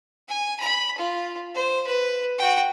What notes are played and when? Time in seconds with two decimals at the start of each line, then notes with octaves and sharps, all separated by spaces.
0.28 G#5
0.60 B5
0.98 F4
1.54 C5
1.87 B4
2.38 F#4 G5